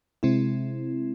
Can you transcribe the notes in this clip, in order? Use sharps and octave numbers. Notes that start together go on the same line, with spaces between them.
C3 G#3 C4 E4